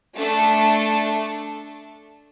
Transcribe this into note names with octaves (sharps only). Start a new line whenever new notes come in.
A3 D4 A4